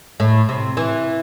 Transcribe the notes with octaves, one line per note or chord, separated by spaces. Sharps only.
A2
C3
E3